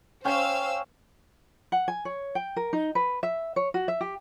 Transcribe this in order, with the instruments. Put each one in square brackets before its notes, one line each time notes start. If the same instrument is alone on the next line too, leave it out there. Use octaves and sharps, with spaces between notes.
[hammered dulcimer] C#4 G5 C#6 [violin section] C5 F5 E6
[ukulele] F#5
G#5
C#5
G5
A#4
D#4
B4
E5
C#5
F#4
E5
G4